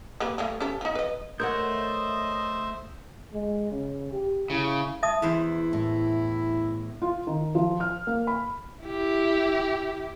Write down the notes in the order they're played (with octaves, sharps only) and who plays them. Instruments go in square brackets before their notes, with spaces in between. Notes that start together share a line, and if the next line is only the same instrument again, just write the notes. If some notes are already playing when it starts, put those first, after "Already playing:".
[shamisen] A#3 G4 B4
F3 G3 A3
C#4 G4 A4
F3 D#4
B4 D#5
[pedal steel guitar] A3 G6 [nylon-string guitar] A#4 C#5 F#5 [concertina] C5 E5 [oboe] D#5
[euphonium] G#3
C#3
G4
[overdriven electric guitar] C#3 [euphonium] E4
[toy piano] E5 A5 D#6
[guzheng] E2 C5 [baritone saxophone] E4
[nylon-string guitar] A2
[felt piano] F4
D#3
F3
F6
A#3
B5
[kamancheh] E4 G4